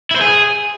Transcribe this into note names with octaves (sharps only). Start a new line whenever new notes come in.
E4
C5
G#4